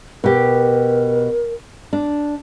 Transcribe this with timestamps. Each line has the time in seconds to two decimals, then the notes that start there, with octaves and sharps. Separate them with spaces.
0.24 B2 G4 A#4
1.93 D4